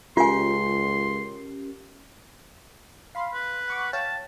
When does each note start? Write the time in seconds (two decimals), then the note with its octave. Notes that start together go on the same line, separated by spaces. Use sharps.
0.17 C#2 C#4 F4 G4 A#4 G#5 C6
3.15 F5 B5 C6
3.34 B4
3.68 F#5 C#6 D6
3.93 C#5 F5 G5 A5